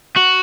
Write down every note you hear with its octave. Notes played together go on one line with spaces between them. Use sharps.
F#4